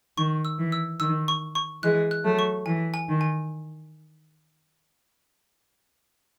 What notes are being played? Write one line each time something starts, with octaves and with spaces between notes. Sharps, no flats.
D#3 C#6
E6
E3
E6
D#3 E6
C#6
C#6
E3 G#3 F#6
F#6
F#3 A3
C#6
E3 G#5
G#5
D#3
G#5